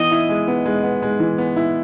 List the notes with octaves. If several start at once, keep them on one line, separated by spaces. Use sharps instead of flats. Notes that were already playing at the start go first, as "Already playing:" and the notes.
Already playing: E3 B3 D#5
E4
G#3
B3
G#3
B3
G#3
E3
B3
E4